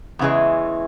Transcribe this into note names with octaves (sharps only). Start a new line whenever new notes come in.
E2 C#3 E3 G#3